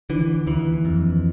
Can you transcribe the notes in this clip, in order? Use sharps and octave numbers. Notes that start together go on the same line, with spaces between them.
D3 E3
D#2 E3
F2